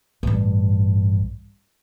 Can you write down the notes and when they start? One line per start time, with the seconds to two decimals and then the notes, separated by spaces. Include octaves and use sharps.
0.23 A1 G2